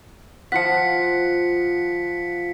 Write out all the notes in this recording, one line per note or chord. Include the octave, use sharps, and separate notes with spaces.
F3 F4 F#5 B6 C#7